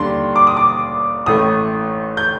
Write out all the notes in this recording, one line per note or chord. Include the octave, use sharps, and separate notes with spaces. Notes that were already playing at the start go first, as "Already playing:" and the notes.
Already playing: D#2 D3 G3 D4 C6
D6
D#6
D6
A1 A2 A3 D#6
G6